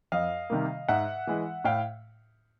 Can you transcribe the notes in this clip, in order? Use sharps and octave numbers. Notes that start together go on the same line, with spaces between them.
F2 D#5 F5
C3 D#3 G3 A#3
G#2 E5 F#5
E3 G#3
A2 F5 G5